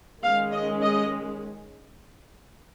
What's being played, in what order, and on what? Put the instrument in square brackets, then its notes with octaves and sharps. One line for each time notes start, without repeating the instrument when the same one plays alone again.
[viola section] D#3 G#3 C#4 F5
D#5
D#5